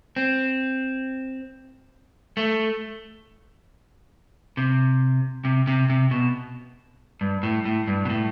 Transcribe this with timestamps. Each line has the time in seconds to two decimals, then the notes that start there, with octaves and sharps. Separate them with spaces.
0.16 C4
2.37 A3
4.57 C3
5.45 C3
5.67 C3
5.90 C3
6.11 B2
7.21 G2
7.43 A2
7.65 A2
7.87 G2
8.05 B2
8.10 A2